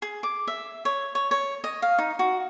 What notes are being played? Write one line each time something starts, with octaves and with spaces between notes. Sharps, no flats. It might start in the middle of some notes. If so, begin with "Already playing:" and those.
G#4
D6
E5
C#5
C#5
C#5
D#5
F5
D#4
F#4